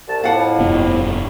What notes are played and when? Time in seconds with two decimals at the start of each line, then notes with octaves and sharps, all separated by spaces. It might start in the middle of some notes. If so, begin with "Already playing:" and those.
0.08 C2 A5
0.24 F2 A2 F5 F#5 A5
0.59 F1 G2 B3